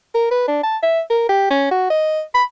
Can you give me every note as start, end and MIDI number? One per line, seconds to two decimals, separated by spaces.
0.15 0.26 70
0.31 0.47 71
0.48 0.61 62
0.63 0.77 81
0.83 1.01 76
1.10 1.25 70
1.29 1.49 67
1.50 1.66 61
1.71 1.88 66
1.90 2.22 75
2.34 2.44 83